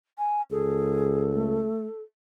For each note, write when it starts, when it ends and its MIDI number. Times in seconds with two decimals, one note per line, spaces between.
0.18 0.41 80
0.51 1.68 37
0.51 1.23 68
0.51 2.00 69
1.33 1.86 57